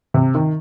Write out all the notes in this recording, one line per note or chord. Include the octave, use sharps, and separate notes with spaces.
C3
D#3